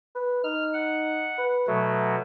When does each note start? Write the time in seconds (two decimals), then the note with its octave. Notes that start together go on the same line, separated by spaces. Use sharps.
0.15 B4
0.44 D#4 F6
0.74 F#5
1.38 B4
1.67 B2 F#3 A3